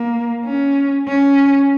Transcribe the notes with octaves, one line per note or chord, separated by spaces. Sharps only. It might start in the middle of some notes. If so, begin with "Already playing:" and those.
Already playing: A#3
C#4
C#4